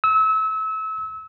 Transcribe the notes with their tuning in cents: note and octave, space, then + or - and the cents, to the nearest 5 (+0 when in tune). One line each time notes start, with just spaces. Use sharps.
E6 -30